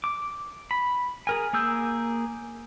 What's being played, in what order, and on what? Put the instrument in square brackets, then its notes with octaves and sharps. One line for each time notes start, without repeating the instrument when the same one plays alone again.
[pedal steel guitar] D6
B5
G#4 A#4 G#5
A#3 G#4 E6 G6